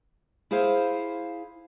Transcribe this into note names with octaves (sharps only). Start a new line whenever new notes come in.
E4 G#4 C5 F5